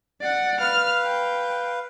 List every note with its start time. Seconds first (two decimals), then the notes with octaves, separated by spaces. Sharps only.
0.21 D5 F#5
0.60 B4 F5 F6
1.02 G5